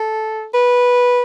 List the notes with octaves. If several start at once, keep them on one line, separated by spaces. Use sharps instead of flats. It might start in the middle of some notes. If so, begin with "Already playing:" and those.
Already playing: A4
B4